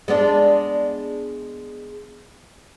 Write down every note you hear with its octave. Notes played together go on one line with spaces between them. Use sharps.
G#3 B3 D4